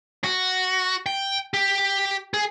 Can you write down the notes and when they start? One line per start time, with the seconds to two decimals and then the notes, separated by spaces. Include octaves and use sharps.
0.24 F#4
1.06 G5
1.54 G4
2.34 G#4